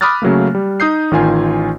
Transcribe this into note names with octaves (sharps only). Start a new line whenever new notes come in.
B5 D6 D#6 F6 F#6 A6
C#3 F#3 A3 A#3
G3
D#4 D#6 G6 C7
A1 D#3 F4 G#5